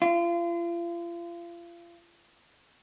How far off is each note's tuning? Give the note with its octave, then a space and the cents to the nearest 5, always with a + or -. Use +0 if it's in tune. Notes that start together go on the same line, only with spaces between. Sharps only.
F4 -35